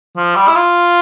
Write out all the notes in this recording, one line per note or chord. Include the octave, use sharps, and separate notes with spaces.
F3
G3
E4
F4